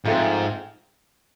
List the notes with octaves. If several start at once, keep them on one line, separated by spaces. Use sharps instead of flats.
G#2 F3 A3 C4